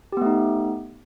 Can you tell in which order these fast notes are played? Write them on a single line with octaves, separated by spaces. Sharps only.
G4 B3 A3 D#4